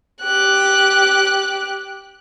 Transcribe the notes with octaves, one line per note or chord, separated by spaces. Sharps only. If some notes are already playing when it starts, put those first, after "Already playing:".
G4 F#6